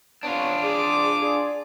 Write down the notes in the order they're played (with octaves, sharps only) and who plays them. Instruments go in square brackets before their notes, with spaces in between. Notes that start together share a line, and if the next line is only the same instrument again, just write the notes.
[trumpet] B3 [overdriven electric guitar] D4 F4 [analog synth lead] C#5
[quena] G#4 [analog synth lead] D5 [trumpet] D6
[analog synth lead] G#4 [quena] D5